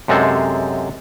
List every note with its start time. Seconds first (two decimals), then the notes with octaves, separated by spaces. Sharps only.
0.08 F#2 C3 G#3 A4 C5